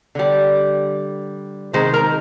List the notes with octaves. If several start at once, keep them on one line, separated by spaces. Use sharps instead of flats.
D3 G3
C3 D#3 G#3 C5
A#4